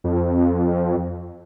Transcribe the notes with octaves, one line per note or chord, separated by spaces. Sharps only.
F2